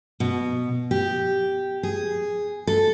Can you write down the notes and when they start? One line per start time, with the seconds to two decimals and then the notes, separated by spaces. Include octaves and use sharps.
0.20 B2
0.91 G4
1.83 G#4
2.67 A4